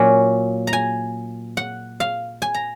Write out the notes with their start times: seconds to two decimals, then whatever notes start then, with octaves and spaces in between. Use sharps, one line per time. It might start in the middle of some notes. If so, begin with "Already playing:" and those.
Already playing: A#2 F#3 C#4 F#5 G#5
0.67 A#5
0.73 G#5
1.57 F#5
2.00 F5
2.42 G#5
2.54 A#5